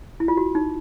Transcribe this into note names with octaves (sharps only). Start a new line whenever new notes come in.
E4
F4
F#4
D#4